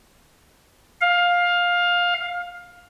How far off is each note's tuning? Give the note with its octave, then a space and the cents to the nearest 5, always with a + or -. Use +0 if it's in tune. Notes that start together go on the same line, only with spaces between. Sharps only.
F5 +15